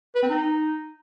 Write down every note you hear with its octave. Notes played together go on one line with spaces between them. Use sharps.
B4
C4
D#4